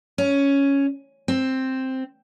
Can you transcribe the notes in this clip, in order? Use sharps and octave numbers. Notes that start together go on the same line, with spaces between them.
C#4
C4